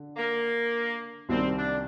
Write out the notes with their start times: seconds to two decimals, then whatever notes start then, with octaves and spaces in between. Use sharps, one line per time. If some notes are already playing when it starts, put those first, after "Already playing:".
Already playing: D3
0.16 A#3
1.29 C2 C3 D#3 G3 C4
1.57 D4